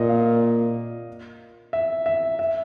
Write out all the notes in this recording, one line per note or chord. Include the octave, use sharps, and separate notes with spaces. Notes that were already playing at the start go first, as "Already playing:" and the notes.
Already playing: A#2 D#5
F5
E5
E5
E5